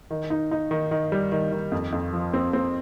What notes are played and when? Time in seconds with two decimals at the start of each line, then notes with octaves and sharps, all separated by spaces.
0.11 D#3
0.30 D#4
0.51 D#4
0.71 D#3
0.91 D#3
1.12 G3
1.32 D#3
1.52 D#3
1.72 F2
1.93 F2
2.13 F3
2.34 C4
2.53 C4